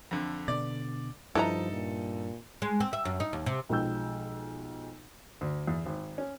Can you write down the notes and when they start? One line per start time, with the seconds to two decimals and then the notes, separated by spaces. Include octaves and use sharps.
0.11 F2 D3
0.48 B2 D3 D5
1.35 G2 F3 D#4 E4 A4 B4 A#5
1.73 A#2
2.62 G#3
2.80 C4
2.93 E5
3.05 F#2
3.20 D#4
3.33 D#2
3.46 C3
3.69 B1 F3 G#3 G5 E6 G6
5.41 D2
5.67 E2
5.86 G#1
6.18 C#4